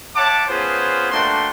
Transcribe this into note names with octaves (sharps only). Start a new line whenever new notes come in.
C#5 E5 F#5 A5 D6
B3 C#4 F4 G#4 B4 C5
A3 A#3 D4 F#4 G5 C6